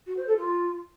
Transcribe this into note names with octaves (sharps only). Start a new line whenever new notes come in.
F#4
C5
A4
F4